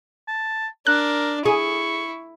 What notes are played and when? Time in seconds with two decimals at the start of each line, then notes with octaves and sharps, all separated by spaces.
0.28 A5
0.87 D4 A#4 F#6
1.46 E4 G#4 C#6